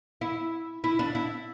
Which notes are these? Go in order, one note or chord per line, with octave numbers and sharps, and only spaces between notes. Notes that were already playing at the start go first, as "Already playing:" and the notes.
E4
E4
D4
E4